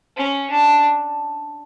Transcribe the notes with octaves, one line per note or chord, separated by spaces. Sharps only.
C#4
D4